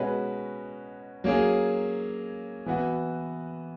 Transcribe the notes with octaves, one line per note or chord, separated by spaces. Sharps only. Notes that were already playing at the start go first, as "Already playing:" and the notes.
Already playing: B2 G#3 C#4 F#4 B4
F#3 A#3 C#4 G#4
E3 B3 F#4